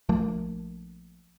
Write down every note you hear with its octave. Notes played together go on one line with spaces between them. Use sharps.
A#1 F3 A3 A#3